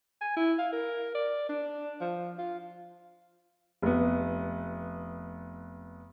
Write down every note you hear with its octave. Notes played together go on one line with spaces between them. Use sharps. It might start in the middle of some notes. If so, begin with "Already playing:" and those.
G#5
E4
F5
A#4
D5
D4
F3
F4
F1 B3